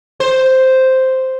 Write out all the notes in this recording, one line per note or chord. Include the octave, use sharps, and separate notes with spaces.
C5